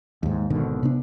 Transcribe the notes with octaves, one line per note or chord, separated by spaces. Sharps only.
D#2 G#2
G#1 B2 D3 D#3
C3 B3 D4